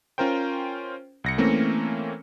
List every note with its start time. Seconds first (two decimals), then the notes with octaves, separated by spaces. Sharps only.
0.18 C#4 F4 A#4 C5 G5
1.24 C2 A#6 C#7
1.38 E3 A3 A#3 C4 C#4